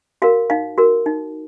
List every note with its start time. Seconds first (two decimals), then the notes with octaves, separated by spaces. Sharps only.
0.22 F#4 A#4 F5
0.50 D#4 F5
0.78 F#4 A#4
1.06 D#4